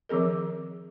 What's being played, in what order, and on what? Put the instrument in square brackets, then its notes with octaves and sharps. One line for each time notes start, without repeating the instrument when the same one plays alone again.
[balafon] D#3 F3 C4 G#4 A#4